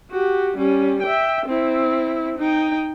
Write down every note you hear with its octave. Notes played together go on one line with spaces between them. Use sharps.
F#4 G4
G3 C#4
E5 G5
C4 E4
D#4 G5